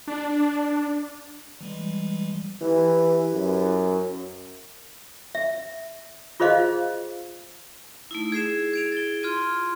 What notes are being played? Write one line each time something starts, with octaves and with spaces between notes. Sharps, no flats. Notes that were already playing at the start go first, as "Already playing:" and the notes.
D4
E3 G3 G#3
E3 E4 G4 B4
F#2
E5
F4 G#4 C5 D#5 F5
A3 D#4 E4
E4 G#4 G#6 C7 E7
G#6 D7 F7
A6 G7
F4 C6 F6 G#6 D#7